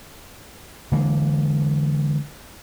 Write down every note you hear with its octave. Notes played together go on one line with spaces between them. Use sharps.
D3 E3 G#3 A#3